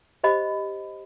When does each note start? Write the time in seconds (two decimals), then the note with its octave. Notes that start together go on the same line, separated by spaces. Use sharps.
0.24 G4 C5 D#5 B5